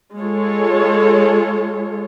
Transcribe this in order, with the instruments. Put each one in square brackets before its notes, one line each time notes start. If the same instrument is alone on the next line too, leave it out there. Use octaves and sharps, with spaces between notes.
[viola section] G#3 F4 A4 C#5